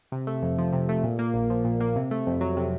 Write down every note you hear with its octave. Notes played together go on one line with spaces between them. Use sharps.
C3
A3
F2
F3
C3
A3
A#2
A#3
A#1
F3
A#2
A#3
C3
A3
F2
F#3
C3